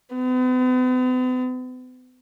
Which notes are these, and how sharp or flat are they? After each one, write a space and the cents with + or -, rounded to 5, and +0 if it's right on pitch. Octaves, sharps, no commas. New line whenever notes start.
B3 +45